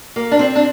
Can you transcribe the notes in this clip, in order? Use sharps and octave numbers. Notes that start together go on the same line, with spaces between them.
A#3
D4
C4
D4